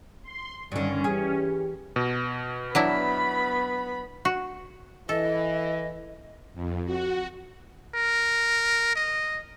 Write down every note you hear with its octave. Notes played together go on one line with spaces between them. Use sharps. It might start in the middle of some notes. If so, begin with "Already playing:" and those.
C6
G2 D3 D#3 C#4
E3 G4 G#4
B2
F#3 B3 D4 E4 B5
F#4
E3 A4 D#5
F2
F#4
A#4
D#5